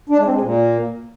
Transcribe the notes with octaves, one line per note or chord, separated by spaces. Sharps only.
D4
G#3
C4
G#3
A#2